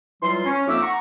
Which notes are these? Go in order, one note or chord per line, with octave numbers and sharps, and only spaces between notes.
E3 F#3 G3 F4 C6
C#4
F2 A#3 D#4 E5 D6 E6
F#5 A#5 C#6